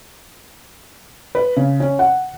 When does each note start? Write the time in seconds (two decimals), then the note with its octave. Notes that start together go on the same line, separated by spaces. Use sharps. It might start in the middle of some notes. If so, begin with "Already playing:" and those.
1.35 B4
1.56 C#3
1.80 C#4
1.99 F#5